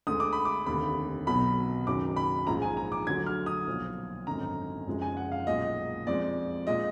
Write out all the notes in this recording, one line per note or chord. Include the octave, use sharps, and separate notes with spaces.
D2 D3 G#3 D#6
D6
B5
D6
F1 D#2 D3 B5
B1 B2 F#3 B5
F#1 F#2 D#3 F#3 D6
B5
A#1 G#2 F3 G#3 A#5
G#5
A#5
D6
D2 D3 F#3 G#6
F6
D#6
B1 A#2 F3
G#1 F#2 D3 A#5
F#1 F#2 F3 G#3
G#5
F#5
F5
B1 A#2 G#3 D#5
F2 F3 G#3 D5
A#2 G#3 D#5